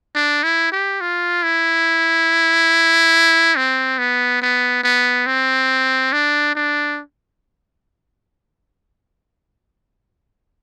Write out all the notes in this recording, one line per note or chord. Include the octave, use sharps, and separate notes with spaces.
D4
E4
G4
F4
E4
C4
B3
B3
B3
C4
D4
D4